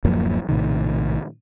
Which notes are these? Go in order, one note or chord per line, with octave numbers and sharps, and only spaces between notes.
D1 F#2 F3 A#3
A#1 A2 C3 D#3